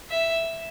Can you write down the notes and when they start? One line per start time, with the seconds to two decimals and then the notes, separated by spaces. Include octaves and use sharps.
0.10 E5